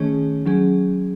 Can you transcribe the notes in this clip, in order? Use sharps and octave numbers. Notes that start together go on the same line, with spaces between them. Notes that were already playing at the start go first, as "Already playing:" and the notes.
Already playing: D#3 A3 C#4 G#4 C#5
F#3 C#4 G#4